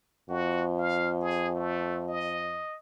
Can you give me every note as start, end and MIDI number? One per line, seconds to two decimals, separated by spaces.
0.29 2.64 41
0.29 0.65 66
0.79 1.13 77
1.22 1.54 68
1.55 2.08 57
2.08 2.78 75